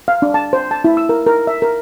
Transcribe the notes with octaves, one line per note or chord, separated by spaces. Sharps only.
F5
D4
A5
C5
A5
E4
E6
A#4
A#4
E5
A#4